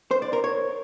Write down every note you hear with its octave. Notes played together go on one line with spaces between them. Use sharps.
C5
D5
A#4
C#5